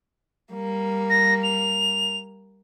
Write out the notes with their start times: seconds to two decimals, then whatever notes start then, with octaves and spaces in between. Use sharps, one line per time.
0.52 G3 A#3
1.10 A#6
1.43 F7